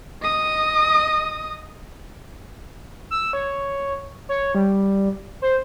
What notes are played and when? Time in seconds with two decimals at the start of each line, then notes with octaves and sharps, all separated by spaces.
0.22 D#5 D#6
3.11 E6
3.33 C#5
4.29 C#5
4.55 G3
5.42 C5